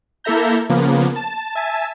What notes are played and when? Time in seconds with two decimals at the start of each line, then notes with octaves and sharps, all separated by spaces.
0.24 A#3 E4 A4 E5 A#5 G6
0.69 C#3 F3 A#3 B3
1.16 A5
1.55 E5 G#5 A5